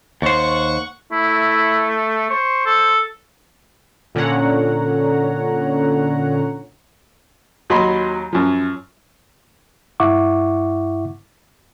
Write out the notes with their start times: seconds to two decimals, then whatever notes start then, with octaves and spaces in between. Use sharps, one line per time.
0.22 D#2 C5 F#5 C#6
1.12 A3 E4
2.30 C5 C#6
2.66 A4
4.15 A#2 D3 C#4 C#5 F#5 A#5
7.70 D#2 F#3 F#4 D#5 B5 C6
8.33 F#2 F3
10.00 G2 E4 E5 F#5 C#6 D6